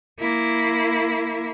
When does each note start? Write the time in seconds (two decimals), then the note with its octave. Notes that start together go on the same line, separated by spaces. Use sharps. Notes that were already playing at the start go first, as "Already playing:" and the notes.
0.20 A#3 E4